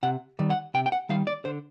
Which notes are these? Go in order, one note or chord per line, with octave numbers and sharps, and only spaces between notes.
C3 F#5
D#3 G3
F#5
C3 G5
G5
F#5
D#3 G3 F5
D5
D3 C5